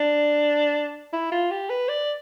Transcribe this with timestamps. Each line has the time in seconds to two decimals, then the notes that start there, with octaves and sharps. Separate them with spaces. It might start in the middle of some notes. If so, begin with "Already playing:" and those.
Already playing: D4
1.13 E4
1.32 F4
1.51 G4
1.70 B4
1.89 D5